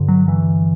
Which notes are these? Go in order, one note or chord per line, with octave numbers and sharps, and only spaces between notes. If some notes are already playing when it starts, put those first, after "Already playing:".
Already playing: G2 D3
F#3
E3